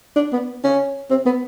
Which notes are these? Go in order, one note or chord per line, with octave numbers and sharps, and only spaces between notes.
D4
B3
C#4
C4
B3